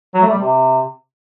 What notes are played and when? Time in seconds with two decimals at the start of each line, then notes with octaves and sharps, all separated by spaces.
0.14 F#3
0.22 A3
0.30 G3
0.37 C3